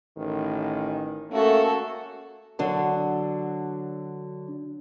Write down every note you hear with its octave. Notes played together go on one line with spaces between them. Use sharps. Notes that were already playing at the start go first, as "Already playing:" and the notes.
A1 D#3
A3 A#3 C#4 F#4 A4
D3 F#3 D4